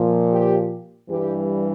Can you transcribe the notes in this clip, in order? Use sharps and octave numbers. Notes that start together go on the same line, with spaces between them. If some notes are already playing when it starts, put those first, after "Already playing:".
Already playing: A#2 F3
G4
G2 E3 G3 G4